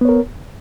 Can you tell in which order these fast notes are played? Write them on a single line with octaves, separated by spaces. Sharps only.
B3 C#5 A#4